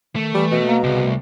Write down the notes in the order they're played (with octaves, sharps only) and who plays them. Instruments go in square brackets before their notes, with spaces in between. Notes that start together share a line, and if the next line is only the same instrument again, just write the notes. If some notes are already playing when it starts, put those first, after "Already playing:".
[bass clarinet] D#3 [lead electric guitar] A3
[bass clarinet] E3 [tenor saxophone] G3
[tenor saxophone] B2
[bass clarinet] A#3
[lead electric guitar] C2 [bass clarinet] C#3
[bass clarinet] A3